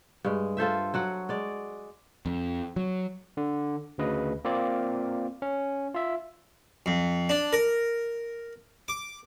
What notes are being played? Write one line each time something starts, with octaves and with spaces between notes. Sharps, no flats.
G2 G#3
F4 A4 C5 E5
F#3 F#4 F#5
G#3 D5
F2
F#3
D3
D2 C#3 B4 D#5
A#3 C4 F4 D5
C#4
F4 E5
F2
D4
A#4
D6